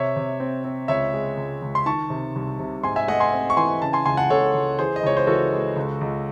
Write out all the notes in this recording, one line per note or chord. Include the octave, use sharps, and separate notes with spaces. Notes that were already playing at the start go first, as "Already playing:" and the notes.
Already playing: C3 C#5 E5
C3
C4
C4
C#2 C#5 E5
G#3
C#2
C#2
C6
D#3 A5 C#6
C3
C2
C3
G#2 G#5 C6
E5 G#5
A3 D#5 F#5
G#5 C6
C4
C#6
E3 G#5 C6
C#3 A5
G#5 C6
C#2 G#5 C6
F#5 A5
C#2 A4 C#5
C#2
E3 G#4 C5
D#5
C#2 C#5
C5
E3 F#4 A4
G#3
C#2
C#2